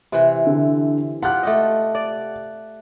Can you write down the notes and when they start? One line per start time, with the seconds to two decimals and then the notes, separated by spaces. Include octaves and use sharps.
0.12 C3 E3
0.47 D3
1.22 F4 G4 F#5 F#6
1.43 A3 G4 D#5
1.95 D5